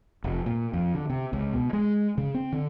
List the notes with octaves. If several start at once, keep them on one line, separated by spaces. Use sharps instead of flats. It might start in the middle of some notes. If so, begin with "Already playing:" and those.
F1
A#2
F2
D3
C3
C#2
B2
G#3
C#3
C4
D3